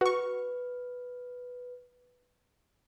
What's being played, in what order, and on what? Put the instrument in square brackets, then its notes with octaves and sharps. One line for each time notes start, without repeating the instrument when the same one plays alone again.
[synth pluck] F#4 C#6 [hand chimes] B4